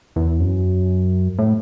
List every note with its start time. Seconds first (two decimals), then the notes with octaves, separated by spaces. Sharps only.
0.16 E2
0.40 F#2
1.39 A2